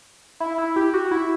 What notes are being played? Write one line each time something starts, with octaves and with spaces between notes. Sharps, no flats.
E4
E4
G4
F#4
E4